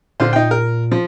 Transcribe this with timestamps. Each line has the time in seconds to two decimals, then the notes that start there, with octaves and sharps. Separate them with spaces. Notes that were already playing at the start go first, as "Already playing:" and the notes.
0.20 A#2 D3 F4 C5
0.33 D#4 G5
0.51 A#4
0.91 F3